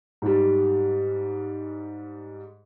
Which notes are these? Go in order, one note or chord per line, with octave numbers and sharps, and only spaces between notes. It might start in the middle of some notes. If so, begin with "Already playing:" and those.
G#2 G3